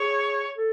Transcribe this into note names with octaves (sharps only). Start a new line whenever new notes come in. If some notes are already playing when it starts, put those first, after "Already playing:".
Already playing: G#4 C#5
A4